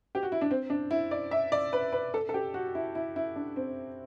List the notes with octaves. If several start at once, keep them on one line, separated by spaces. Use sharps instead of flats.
G4
F#4
E4
D4
C4
D4
E4
D5
E5
D5
B4
B4
A4
A4
G4
F#4
E4
E4
E4
D4
C4